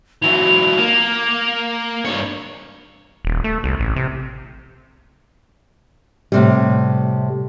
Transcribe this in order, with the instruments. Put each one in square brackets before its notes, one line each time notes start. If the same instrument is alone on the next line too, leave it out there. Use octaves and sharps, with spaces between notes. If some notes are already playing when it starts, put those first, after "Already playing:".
[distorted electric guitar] E3 F#3 [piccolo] F7
[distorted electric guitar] A#3
G2 C#5
[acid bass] D#1
A3
C2
A1
C3
[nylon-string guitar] A2 C3 G3